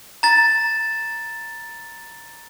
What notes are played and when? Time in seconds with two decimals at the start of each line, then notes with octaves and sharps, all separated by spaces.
0.23 A#5 A6